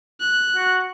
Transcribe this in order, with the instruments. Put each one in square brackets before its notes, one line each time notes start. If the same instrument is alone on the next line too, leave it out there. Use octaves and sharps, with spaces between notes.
[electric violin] F#6
[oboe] F#4